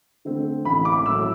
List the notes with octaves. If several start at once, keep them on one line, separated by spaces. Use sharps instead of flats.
D3 A3 C4
A1 B5
D6
A2 F#3 E6